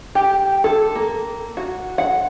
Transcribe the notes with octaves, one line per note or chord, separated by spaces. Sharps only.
G4
A4
A#3
F#4
F#5